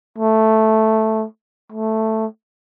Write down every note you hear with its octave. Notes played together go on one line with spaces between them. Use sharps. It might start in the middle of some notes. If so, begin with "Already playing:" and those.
A3
A3